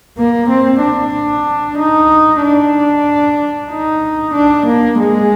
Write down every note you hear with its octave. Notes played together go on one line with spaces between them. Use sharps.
A#3
C4
D4
D#4
D4
D#4
D4
A#3
G#3